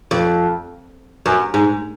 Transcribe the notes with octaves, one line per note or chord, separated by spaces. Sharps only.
F2
F#2
G#2